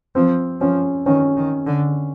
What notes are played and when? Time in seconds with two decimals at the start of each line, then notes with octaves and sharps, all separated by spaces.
0.15 F3 C4
0.61 F3 C#4
1.06 D#3 C#4
1.37 D#3
1.67 D3